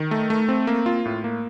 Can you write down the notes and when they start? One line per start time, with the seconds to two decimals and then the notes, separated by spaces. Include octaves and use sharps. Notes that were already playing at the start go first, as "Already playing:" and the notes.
Already playing: D#3
0.11 A3
0.30 A3
0.49 C4
0.67 A#3
0.86 F4
1.05 A2
1.24 A#3